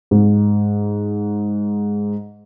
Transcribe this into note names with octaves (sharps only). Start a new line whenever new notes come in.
G#2